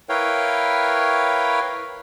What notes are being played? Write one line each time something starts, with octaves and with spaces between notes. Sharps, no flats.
E4 A#4 B4 C#5 F5 G5